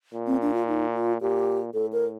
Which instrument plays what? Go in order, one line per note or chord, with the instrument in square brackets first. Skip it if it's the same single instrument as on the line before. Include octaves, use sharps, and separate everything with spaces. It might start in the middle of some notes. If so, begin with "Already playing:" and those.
[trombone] A#2
[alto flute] C4
D4
F4
D#4
F4
[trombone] A#2 [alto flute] G4
[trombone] A2 [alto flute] A4
[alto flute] A#4